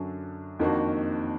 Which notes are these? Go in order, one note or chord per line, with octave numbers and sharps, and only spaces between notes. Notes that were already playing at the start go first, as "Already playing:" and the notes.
Already playing: F#2 D3 F#3 D4
F2 D#3 A#3 D4 F#4